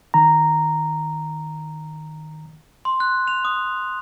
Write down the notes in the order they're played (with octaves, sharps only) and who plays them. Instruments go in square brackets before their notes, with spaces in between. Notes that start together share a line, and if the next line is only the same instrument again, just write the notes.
[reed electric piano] D#3 A#5
[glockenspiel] C6
F#6
F7
D#6